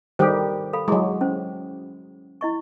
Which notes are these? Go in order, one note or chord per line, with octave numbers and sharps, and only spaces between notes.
D#3 G3 G4 A4 C5
A4 F5 B5
F#3 G#3 E4 F#4 G#4
C#4 C5
E4 D#5 C#6